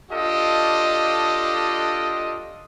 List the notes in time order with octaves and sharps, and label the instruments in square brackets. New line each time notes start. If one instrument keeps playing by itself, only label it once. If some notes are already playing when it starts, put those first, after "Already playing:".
[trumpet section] D4 F4 G4 A4 D#5